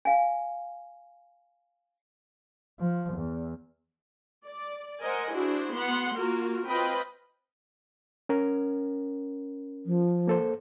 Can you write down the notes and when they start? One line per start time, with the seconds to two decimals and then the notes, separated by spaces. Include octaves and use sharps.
0.05 F5 G#5
2.79 F3
3.13 E2
4.45 D5
5.01 A#4 C5 D#5 F#5 G#5
5.32 D4 E4 F#4 G#4 C5
5.74 B3 F#5 C6
6.14 A#3 F4 F#4 A#4
6.66 C4 F4 B4 D#5 G5 B5
8.29 C#4 A#4
9.86 F3
10.27 A#3 A4 C5